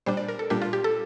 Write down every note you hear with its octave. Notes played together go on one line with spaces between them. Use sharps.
A#2 G3 D4 C5
D5
A#4
A4
A#2 G3 D4 G4
F4
G4
A4